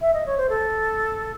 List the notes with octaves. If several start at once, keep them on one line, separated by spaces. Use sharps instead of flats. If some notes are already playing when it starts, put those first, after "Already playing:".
E5
D#5
C#5
C5
A4